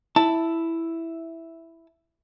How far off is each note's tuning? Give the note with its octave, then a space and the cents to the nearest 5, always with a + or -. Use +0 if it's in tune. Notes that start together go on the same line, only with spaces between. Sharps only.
E4 +0 A5 +10